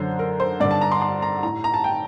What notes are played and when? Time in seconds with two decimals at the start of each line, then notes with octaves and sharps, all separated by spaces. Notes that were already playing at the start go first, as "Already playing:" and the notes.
Already playing: F#2 D3 C5
0.19 A#4
0.40 C5
0.60 G2 D3 D5
0.71 A5
0.81 A#5
0.92 C6
1.02 C6
1.22 A#5
1.43 A2 A#5
1.64 A#5
1.74 A5
1.84 G5